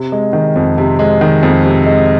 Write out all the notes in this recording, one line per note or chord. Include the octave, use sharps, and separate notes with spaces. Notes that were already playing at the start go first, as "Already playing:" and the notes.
Already playing: C3
G#3
D#3
F2
C3
G#3
D#3
F2
C3
G#3